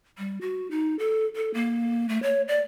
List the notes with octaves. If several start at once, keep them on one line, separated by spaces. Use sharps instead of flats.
G3
F#4
D#4
A4
A4
A#3
A3
C#5
D5